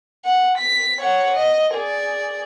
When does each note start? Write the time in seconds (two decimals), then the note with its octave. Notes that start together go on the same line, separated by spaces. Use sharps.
0.25 F#5
0.58 B6
1.00 C#5 F#5
1.36 D#5
1.74 G#4 D5